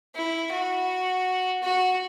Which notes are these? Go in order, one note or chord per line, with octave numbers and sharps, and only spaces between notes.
E4
F#4
F#4